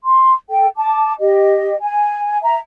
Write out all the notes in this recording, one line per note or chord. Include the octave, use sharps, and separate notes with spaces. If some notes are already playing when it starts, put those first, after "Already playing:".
C6
A4 G5
A5 D6
G4 D#5
G#5
E5 A#5